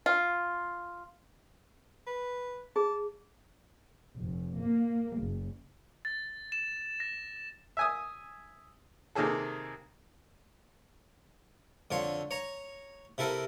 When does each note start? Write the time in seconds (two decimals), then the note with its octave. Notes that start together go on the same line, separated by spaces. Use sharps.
0.06 F4
2.07 B4
2.76 G#4 A5
4.16 F1
4.58 A#3
5.17 F#1
6.05 A6
6.52 E7
7.00 A#6
7.77 E5 G#5 D#6
9.15 C3 D#3 A#3 G#4 A4
11.91 F2 D3 C#5 C6
12.31 C#5 A#5
13.18 C3 E4 A4 A#4